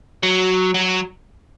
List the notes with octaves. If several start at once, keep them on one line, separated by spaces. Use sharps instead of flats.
F#3
F#3